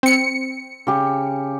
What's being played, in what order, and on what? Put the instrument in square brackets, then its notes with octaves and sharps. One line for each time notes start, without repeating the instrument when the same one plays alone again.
[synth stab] C4 C#7
[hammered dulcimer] C#3 G4